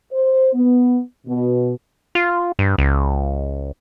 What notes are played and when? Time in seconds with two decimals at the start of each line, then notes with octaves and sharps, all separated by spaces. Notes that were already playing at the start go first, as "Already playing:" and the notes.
0.13 C5
0.54 B3
1.27 B2
2.15 F4
2.59 G2
2.78 C#2